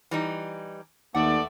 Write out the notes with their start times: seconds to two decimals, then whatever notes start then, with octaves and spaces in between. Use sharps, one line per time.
0.11 E3 G3 D#4
1.14 D#2 A3 B3 D5 F#5